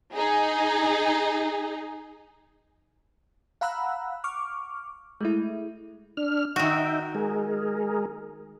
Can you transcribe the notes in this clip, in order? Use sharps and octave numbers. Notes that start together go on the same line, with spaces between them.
D#4 G#4
F5 F#5 A#5 B5 E6 F#6
C#6 D6 F6
G#3 A3 E4
D4 F6
D#3 D#4 F#4 E5 G5
G#3 G#4 A#4